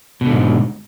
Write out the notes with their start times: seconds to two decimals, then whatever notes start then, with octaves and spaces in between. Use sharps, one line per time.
0.21 B2
0.26 D3
0.31 G#2